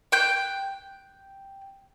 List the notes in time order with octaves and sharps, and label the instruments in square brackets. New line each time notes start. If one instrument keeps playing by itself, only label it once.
[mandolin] G5 F#6 G6